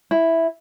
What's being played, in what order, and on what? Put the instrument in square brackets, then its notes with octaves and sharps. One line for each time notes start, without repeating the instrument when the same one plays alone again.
[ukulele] E4